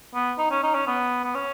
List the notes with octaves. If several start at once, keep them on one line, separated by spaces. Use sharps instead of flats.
B3
D#4
C#4
D#4
C#4
B3
B3
C#4